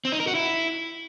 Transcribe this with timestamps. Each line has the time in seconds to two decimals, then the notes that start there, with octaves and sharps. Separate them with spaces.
0.05 C4
0.12 D#4
0.20 A#4
0.27 F#4
0.35 E4